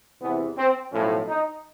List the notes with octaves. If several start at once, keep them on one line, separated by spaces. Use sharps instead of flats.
E2 C3 E3 B3
C4
B1 A2 F3 C#4
D#4